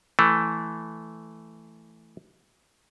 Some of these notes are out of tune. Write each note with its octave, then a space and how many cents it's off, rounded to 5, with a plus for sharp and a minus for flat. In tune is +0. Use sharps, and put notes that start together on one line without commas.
E3 +0 A3 +0